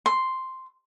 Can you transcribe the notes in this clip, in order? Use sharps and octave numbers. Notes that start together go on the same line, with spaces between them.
C6